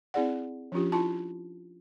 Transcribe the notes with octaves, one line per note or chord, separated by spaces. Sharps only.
C4 E4 G#4 D5 F#5
F3 C#4 D4 F4 G4
E4 F4 A5